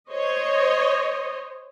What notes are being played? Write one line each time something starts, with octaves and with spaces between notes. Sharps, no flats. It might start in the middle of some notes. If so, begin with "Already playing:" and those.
C5 C#5 D#5